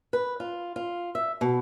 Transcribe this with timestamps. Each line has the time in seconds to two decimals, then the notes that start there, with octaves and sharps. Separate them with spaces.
0.13 B4
0.40 F4
0.76 F4
1.15 E5
1.41 B2